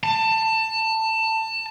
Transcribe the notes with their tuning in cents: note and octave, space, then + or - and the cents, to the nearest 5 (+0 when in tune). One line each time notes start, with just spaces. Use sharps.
A5 +20